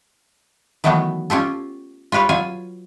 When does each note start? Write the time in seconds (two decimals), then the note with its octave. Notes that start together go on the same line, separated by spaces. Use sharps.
0.84 D#3 E3 F#3 A3 B3 F#4
1.30 C#4 F4 G4 A4
2.12 F4 G4 B4 C#5 F5
2.29 F#3 F4 F5 G#5